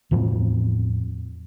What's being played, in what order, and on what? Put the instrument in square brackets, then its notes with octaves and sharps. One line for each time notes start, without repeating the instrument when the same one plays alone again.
[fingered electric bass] E2 A2 F3 C4